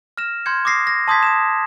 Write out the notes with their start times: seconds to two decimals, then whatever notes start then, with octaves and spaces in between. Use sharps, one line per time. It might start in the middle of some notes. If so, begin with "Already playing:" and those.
0.18 F6 A#6 E7
0.46 C6 F6 G6 G#6 C#7
0.65 D6 D#6 A#6 C7
0.87 A#6
1.08 A5 C6 D#6 G6 G#6 B6
1.23 D#6 E7